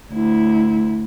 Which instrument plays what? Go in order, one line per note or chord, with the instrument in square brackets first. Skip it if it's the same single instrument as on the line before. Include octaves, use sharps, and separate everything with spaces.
[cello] D2 E4